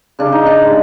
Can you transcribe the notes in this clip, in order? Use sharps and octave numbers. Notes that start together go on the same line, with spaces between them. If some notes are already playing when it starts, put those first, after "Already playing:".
C#3 D4
D#4
D4
G#3